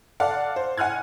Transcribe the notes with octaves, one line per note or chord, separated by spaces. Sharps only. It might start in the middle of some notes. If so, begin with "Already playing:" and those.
A4 D5 F5 F#5
C5
F#5 G#5 F6 F#6 G#6